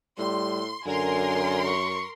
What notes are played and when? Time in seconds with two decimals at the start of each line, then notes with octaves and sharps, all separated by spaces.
0.18 A2 G3 C6
0.86 F#2 D3 A#4 G#5 C6
1.66 C#6